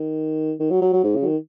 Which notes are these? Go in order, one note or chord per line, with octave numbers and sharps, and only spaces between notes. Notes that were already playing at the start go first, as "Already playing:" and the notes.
Already playing: D#3
D#3
F#3
F#3
F#3
G#2
C#3
F#3
D#3